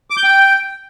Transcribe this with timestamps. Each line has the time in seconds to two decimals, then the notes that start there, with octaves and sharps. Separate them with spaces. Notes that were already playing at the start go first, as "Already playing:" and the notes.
0.10 D6
0.17 G6
0.24 G5